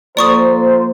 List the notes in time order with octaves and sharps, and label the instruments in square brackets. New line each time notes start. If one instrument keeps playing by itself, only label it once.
[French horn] F3 [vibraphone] A#3 A4 [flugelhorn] C5 [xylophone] D5 C#6 D#6